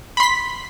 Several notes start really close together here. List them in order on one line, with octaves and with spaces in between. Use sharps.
B5 C6 B6